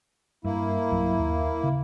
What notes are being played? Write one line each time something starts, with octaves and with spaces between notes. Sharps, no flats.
G2 A#3 E4
B1 G2 F#3
D#2
C#3